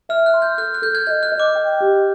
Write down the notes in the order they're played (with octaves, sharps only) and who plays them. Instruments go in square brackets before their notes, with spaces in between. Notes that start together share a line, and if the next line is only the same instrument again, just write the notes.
[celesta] E5 [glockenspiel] F6
[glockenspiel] F#6
[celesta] C6
[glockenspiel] G6
[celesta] A4 [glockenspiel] F#6
[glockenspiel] F#6
[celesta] A4 [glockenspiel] G6
[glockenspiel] F#6 G#6
[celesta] D#5 [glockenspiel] G6
[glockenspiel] F#6
[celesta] D#5
[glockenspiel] D6
[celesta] G5
G4